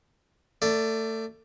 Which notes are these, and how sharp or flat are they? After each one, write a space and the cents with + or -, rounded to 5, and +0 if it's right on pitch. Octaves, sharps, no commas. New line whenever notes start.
A3 +25 D5 +0